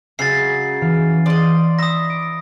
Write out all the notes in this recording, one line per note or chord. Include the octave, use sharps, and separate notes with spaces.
C#3 F#3 G#3 E5 A6 B6 C7
E3 F5
D5 D#5 C6 D#6
E5 B5 D#6 A#6
D6 D7